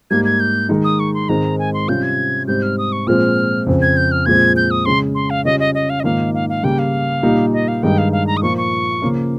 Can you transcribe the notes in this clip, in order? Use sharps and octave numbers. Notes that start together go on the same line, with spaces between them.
G#2 G3 A#3 G#6
G#6
G6
D#3 G#3 D#4
D#6
C#6
C6
G#2 D#3 G#3 C4 A#5
G#5
C6
C3 G3 C#4 F4 G6
G#6
G#2 G3 C4 G6
F6
D#6
C#6
A#2 F3 G#3 C4 F6
F2 C#3 F3 C4
G#6
G6
F6
A#2 F3 G#3 C4 G#6
G6
D#6
C#3 G#3 C#4 C6
C6
F5
C#3 G3 C#4 F4 D#5
D#5
D#5
F5
D#5
G#2 D#3 A#3 F4 F5
F5
F5
C#3 G3 A#3 G5
F5
A#2 G3 A#3 D#4
D#5
F5
G2 D#3 G#3 D#4 G5
F5
F5
A#5
D#6
A#2 F3 A#3 F4 C#6
C#6
C#3 F3 A#3 C#4